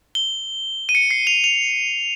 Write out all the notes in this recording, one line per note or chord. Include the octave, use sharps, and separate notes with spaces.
G7
D#7
C#7
C7
F7
F7